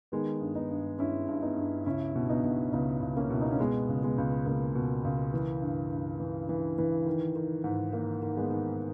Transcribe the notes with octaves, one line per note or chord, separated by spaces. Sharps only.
D#3 G#3 B3
G2
B3 D#4
G2
G2 C#4 E4
G2
B3 D#4
G2
C#2 C#4 E4
B2
B3 D#4
B2
C#2 B3 D#4
C#2
A#3 C#4
B2 E4
D#4
C#4
B2 G#3 B3
C#2
G#3 B3
C#2
C#2 A#3
B2
C#2
E3
G2
G2
E3
E3
E3
D#3
D#3
G#2
D#3 A#3
D#3
G#3 B3
D#3